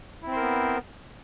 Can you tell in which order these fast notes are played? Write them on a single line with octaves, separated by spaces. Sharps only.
E4 C4 C5 A#4 B3